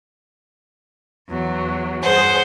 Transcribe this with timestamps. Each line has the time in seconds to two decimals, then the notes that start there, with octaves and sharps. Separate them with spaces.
1.28 E2 F#3
2.03 G2 G#4 C5 F#5